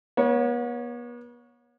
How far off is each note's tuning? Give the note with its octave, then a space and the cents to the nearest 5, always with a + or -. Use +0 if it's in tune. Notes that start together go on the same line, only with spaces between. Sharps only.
B3 -40 C#5 +0